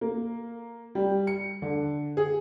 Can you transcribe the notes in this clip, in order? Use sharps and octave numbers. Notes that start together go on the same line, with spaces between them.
A#3
G3
C#7
D3
G#4